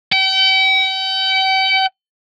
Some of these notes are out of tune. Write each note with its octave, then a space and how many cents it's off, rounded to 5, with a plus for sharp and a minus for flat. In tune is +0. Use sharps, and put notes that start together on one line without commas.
G5 -40